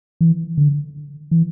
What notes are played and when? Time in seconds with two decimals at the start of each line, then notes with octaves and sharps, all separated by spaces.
0.21 E3
0.58 D3
1.31 E3